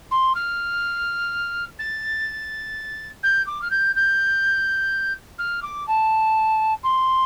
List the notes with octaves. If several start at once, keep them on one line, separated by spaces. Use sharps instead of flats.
C6
F6
A6
G6
D6
F6
G6
G6
F6
D6
A5
C6